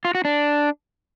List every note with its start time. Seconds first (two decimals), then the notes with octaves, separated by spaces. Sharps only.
0.05 F4
0.15 F#4
0.25 D4